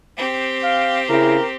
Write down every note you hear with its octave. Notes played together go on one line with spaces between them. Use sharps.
C4 G4
F5
C#3 E4 A#4